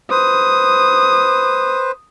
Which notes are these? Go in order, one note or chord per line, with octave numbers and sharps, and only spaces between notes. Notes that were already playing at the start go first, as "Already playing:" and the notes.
B4 C5 D#6